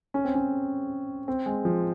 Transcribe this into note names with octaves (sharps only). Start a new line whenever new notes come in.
C#4
C4
C#4
C4
G#3
F3